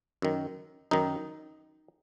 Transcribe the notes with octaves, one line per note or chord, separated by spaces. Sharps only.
F#2 D#3
F#2 D#3 D#4